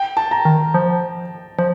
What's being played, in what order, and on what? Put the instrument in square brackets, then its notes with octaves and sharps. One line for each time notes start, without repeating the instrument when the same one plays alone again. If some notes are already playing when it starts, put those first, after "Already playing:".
Already playing: [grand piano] G5
A5
A#5
[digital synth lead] D#3
F3
F3